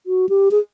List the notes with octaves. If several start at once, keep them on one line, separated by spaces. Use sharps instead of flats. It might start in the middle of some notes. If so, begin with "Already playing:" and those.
F#4
G4
G#4